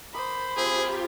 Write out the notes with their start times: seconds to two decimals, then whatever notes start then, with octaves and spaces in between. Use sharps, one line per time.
0.14 A#4 C5 B5 D6 D#6
0.57 F3 C4 F4 G4 G#4 A#4